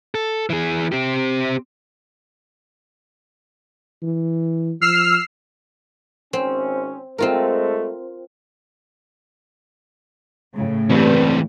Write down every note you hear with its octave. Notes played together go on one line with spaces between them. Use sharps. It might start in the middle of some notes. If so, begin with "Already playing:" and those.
A4
E3 G#4
C4 G4
E3
F3 E6 F6 C7
G#1 C4 C#4
G#3 A3 C4 F4 A#4
A2 C#3
G2 E3 C4